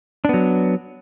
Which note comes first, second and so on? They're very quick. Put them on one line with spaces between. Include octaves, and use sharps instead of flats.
D4 B3 F#3